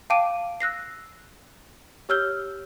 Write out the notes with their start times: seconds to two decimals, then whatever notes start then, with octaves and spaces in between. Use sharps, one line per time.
0.10 F5 G5 A5 D6 D7 D#7
0.60 E6 F#6 A#6 C7
2.09 G4 C#5 E6 F6 G6 G7